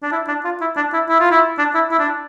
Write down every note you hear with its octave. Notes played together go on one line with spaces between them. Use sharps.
D4
E4
D4
F4
E4
D4
E4
E4
F4
E4
D4
E4
E4
D4